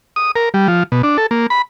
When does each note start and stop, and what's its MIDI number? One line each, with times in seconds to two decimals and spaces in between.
0.16 0.31 87
0.36 0.49 70
0.54 0.67 55
0.68 0.83 53
0.92 1.02 47
1.03 1.17 62
1.18 1.26 69
1.31 1.47 58
1.50 1.62 83